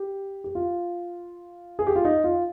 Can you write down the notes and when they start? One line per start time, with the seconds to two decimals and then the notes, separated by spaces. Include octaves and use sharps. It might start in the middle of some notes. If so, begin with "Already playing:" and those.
Already playing: G4
0.44 G4
0.55 F4
1.79 G#4
1.87 G4
1.96 F4
2.05 D#4
2.24 F4